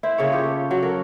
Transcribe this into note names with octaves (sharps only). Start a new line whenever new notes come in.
E4 C5
C#3 A#3 C#5
F4 G4 C#5
A4
F#3 F#4
A4 A#4